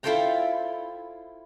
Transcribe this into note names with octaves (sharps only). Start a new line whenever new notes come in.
E4 F4 A4 C5 G5 A#5